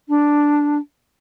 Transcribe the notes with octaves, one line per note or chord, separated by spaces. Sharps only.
D4